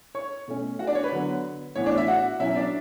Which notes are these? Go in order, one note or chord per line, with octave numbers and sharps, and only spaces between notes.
C#5 C#6
B2 A3 C#4
F#4 F#5
D4 D5
C#5
B4
D3 F#3 B3
A2 E3 B3 C#5
D4 D5
E4 E5
F#4 F#5
B2 F#3 C#4 E4 E5
E5
D4 D5